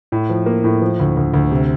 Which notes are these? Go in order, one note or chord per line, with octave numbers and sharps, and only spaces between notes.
A2
F3
A#3
A2
F3
D2
D2
D2
C3